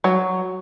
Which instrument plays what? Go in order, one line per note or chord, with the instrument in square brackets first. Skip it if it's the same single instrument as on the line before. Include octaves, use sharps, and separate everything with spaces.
[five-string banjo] F#3